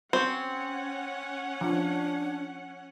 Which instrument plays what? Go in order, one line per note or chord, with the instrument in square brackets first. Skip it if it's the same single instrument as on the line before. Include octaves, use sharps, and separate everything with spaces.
[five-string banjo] C4 [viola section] C#4 F#5 [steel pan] F#4
[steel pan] F3 [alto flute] D4